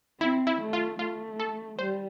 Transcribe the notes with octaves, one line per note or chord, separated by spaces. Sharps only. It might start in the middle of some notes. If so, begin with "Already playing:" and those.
C4 E4
E4
A3
F4
A3 F4
A4
G3 C5